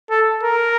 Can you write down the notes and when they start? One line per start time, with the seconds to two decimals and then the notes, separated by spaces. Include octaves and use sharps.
0.11 A4
0.43 A#4